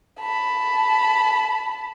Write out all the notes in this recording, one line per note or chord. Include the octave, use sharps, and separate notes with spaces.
A5 B5